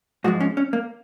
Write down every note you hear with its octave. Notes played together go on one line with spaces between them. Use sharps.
G#2 F3 G#3 F#4
C#4
C#4
A#3